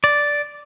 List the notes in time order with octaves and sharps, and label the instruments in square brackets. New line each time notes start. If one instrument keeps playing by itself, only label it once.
[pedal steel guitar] D5